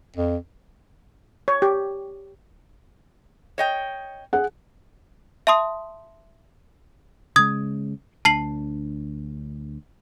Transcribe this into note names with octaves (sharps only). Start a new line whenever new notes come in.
F2
C#5
G4
C#5 D#5 G5
G#4 F#5
E5 A5 C6 D#6
C#3 G#3 D#6 G#6
D2 D4 A5 C7 F#7